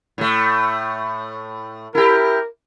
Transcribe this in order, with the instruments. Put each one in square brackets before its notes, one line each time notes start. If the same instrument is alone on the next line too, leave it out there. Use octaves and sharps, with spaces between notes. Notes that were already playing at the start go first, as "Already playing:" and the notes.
[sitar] A2 A3
[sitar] E4 G4 [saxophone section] A#4